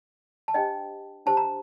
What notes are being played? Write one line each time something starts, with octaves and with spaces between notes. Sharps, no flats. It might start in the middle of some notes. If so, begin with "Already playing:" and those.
A5
D4 G4 C5 D#5 G5
D4 G4 C5 A5
A#5